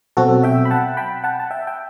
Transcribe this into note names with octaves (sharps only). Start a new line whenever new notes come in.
B2 F#3 C4 F#4 A4
E5 G5
B5
F#5 A5
G5 B5
F#5 A5
A5
E5 G5
G5